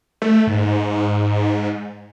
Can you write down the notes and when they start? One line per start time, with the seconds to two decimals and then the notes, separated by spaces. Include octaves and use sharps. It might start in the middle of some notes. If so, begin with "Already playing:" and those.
0.22 A3
0.47 G#2